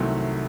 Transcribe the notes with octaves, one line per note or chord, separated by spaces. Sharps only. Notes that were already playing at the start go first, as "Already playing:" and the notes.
Already playing: C2 C3 D#3 F#3 A3